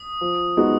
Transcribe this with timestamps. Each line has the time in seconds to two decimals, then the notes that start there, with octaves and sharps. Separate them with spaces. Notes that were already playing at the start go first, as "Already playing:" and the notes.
Already playing: D#6
0.21 F3
0.57 G#3 B3 D#4 F#4